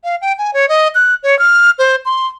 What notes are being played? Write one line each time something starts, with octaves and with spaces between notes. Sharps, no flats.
F5
G5
G#5
C#5
D#5
F#6
C#5
F6
C5
C6